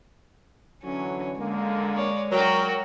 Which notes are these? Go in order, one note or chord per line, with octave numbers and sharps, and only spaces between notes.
D3 E3 F#3 C#4
D3 G#3 A#3
C#5 D5
F#3 F#4 A#4 G5